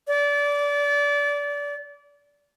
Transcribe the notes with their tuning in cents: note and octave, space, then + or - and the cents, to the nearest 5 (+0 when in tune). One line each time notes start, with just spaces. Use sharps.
D5 -25